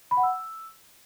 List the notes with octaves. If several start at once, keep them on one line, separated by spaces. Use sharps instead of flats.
B5
F#5
E6